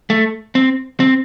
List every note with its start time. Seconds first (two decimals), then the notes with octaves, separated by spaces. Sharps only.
0.10 A3
0.55 C4
1.00 C4